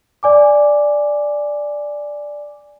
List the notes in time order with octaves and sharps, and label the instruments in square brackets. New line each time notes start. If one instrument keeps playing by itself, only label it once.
[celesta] D5 G#5 D6